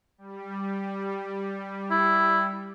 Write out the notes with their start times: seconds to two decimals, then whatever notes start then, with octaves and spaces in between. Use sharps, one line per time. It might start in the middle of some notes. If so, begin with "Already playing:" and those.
0.18 G3
1.91 E4